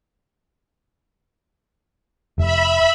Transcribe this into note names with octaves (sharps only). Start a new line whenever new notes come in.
F1 E5 B5